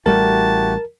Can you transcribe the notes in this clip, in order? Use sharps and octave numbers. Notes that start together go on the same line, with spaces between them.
A1 G3 A3 E4 F#4 G4 A#4 A5